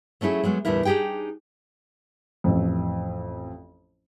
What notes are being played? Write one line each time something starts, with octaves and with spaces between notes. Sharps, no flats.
F#3 A3 C#4 E4 G#4
F#3 G#3 A3 B3
E2 A2 D3 G3 E4 A#4
D4 D#4 G4 G#4 G5
A1 F2